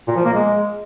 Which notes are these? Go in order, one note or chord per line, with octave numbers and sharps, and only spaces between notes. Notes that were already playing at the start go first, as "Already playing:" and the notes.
A#2
F3
A#3
G#3